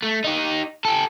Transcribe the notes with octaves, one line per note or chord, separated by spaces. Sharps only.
A3
D#4 G4
G4 A4